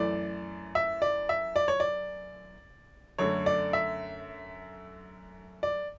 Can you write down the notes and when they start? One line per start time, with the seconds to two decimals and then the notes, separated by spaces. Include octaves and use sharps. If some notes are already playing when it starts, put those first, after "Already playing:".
Already playing: F#2 E3 A3 D5
0.75 E5
1.02 D5
1.29 E5
1.56 D5
1.68 C#5
1.80 D5
3.18 F#2 D3 A3 C#5
3.46 D5
3.73 E5
5.63 D5